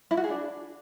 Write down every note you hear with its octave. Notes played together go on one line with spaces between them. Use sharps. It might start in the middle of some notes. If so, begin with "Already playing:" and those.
E4
F#4
G#4
D4